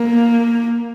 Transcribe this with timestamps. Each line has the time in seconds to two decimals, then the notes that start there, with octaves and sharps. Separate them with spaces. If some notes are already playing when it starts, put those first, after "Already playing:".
Already playing: A#3